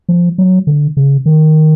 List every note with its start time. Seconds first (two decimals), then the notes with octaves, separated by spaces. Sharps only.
0.09 F3
0.38 F#3
0.67 D3
0.97 C#3
1.26 D#3